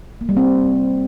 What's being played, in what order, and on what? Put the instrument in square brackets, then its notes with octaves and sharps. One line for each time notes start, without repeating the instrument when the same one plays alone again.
[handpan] A#3
G3
C4